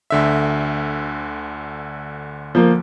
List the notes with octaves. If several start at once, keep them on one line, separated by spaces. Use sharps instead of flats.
D2 D3 E5
F3 A#3